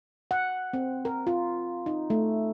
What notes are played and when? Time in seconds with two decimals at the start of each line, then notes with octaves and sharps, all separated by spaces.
0.31 F#5
0.73 C4
1.05 A#4
1.27 F4
1.86 D#4
2.10 A3